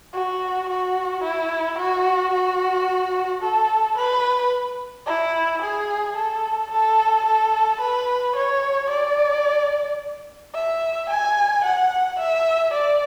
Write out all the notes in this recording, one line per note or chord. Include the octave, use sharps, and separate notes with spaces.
F#4
F#4
E4
F#4
F#4
A4
B4
E4
G#4
A4
A4
A4
B4
C#5
D5
E5
G#5
F#5
E5
D5